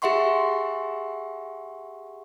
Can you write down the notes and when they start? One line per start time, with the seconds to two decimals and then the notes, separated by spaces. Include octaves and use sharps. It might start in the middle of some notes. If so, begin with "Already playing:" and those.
0.02 G4 G#4 E5 F#5 C6 C#6